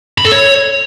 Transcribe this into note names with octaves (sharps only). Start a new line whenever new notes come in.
B5
A4
C#5